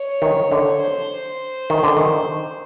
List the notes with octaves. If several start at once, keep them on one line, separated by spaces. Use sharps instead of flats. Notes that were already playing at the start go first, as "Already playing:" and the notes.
Already playing: C#5
D#3
D3
C5
D#3
D3
D#3